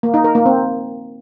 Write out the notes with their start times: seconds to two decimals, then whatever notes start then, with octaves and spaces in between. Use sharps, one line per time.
0.03 A#3
0.14 D#4
0.24 A#4
0.35 A#3
0.46 C4